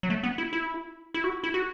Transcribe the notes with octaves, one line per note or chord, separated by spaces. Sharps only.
F#3
A3
B3
E4
E4
E4
F#4
E4
F#4